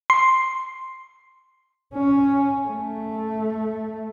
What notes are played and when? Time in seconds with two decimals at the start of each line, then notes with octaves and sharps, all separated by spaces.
0.10 C6
1.94 C#4
2.67 A3